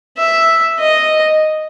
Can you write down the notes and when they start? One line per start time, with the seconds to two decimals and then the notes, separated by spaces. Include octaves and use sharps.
0.18 E5
0.79 D#5